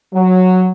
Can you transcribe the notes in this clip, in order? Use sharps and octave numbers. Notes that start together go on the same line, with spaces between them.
F#3